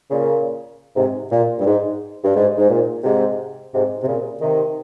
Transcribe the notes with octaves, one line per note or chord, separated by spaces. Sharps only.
A#2 C#3
G#2 C3
A#2
G2
G#2
G2
G#2
G#2
A#2
G#2 C3
G#2 C3
C3
A#2 C#3
C3 D#3